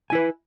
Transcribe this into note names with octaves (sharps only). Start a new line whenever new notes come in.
E4 B4 G#5